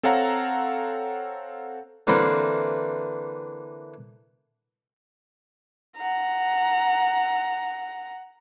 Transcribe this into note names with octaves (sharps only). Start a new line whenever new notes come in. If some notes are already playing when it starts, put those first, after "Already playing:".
C4 A4 C#5 F5 F#5 A#5
D3 E3 A#3 C4 D4
F#5 A#5